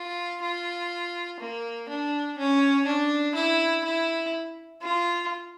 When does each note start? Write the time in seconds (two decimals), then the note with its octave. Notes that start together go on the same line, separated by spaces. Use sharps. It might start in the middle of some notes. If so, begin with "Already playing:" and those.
Already playing: F4
0.42 F4
1.40 A#3
1.89 D4
2.37 C#4
2.87 D4
3.35 E4
3.84 E4
4.82 F4